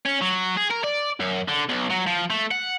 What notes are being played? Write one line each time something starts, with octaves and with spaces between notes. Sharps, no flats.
C#4
F#3
G#4
A#4
D5
F#2
D3
B1
F#3
F3
A3
F#5